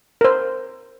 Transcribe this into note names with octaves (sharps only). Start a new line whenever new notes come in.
A#4 C5